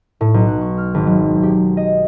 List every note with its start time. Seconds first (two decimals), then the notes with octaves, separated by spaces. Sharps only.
0.21 A2
0.34 B1
0.47 F#6
0.61 C#6
0.78 F6
0.94 G#1
1.07 F#3
1.43 G4
1.77 D#5